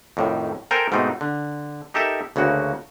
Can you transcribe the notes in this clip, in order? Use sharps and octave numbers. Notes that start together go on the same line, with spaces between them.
F2 A2 D#3
A4 A#4 C5 G5 G#5
G#2 B2 A3 C4 D#4
D3
D#4 G4 A4 A#4 E5
D2 C#3 A#3 F#4